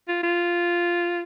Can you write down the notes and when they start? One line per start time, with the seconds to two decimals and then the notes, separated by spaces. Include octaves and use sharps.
0.08 F4
0.23 F4